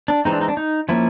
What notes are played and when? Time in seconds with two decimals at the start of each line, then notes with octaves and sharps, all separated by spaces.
0.08 D4
0.25 E3 G#3 C4 D#4
0.32 D4
0.41 D#4
0.48 D4
0.57 D#4
0.89 F3 A#3 C#4 E4